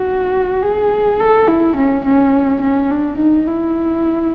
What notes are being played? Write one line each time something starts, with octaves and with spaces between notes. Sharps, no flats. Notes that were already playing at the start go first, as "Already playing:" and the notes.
Already playing: F#4
G#4
A4
E4
C#4
C#4
C#4
D4
D#4
E4